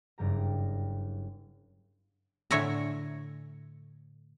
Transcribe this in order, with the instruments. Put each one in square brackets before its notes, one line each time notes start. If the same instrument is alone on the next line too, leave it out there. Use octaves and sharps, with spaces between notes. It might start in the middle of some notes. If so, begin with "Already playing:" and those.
[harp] F#1 G2 G3 G4 A#5
[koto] A2 D3 C#5 E5 G#5 A#5